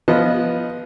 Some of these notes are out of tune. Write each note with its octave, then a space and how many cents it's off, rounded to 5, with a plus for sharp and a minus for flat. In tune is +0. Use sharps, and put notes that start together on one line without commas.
F3 -10 B3 -10 D#5 +0